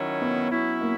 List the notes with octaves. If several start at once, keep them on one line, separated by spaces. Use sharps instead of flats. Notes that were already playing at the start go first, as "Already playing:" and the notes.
Already playing: D#3 F#3 C#4 E4
B3
F#3 C#4 E4
A#3